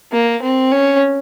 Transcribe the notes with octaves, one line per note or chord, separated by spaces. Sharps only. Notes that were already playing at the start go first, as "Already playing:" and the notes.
A#3
C4
C#4